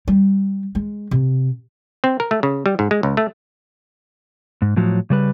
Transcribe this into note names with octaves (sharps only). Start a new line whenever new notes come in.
G3
G#3
C3
C4
A#4
A3
C#3
G3
G#2
G#3
C#2
A3
G#2
A2 F3 F#3
C#3 G3 B4